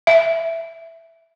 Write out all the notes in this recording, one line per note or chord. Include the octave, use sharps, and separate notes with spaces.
E5